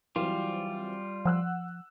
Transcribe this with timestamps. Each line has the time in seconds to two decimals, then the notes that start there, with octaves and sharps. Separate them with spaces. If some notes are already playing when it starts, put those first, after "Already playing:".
0.16 E3 F#3 G3 C4 F4
1.26 F3 F#5 E6 F#6